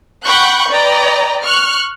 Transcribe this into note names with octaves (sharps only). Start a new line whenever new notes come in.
F#5 G5 B5 C#6 F#6 G6
B4 D5 D#5 G5 A#5
C#6 F6 F#6